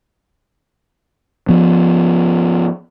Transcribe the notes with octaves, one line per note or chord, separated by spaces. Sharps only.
F3 B3